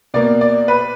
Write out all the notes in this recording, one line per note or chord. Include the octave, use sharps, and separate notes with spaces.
B2 A#3 D5
D5
B4